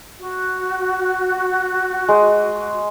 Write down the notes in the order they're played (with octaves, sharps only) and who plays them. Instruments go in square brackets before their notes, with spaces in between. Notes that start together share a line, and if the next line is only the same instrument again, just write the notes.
[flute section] F#4
[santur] G#3